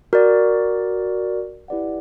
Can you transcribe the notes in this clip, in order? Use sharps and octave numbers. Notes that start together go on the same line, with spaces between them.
F#4 A#4 D5
E4 G4 B4 D5 F#5